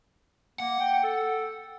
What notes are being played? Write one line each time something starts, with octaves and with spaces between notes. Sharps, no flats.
A#3 F#5
G5
A4